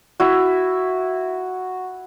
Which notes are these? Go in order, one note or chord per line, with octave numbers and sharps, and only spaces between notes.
E4 F#4